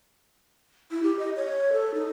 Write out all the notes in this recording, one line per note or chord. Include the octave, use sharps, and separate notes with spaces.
E4
G4
D#5
C#5
A4
D#4